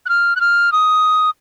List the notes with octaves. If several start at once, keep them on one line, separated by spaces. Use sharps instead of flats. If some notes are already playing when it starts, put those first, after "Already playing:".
F#6
F6
F#6
F6
D#6